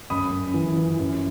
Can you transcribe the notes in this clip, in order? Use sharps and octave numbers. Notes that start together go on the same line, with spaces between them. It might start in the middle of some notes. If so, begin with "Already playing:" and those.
F#2 B5 D#6
F#2
E3
E3
F#2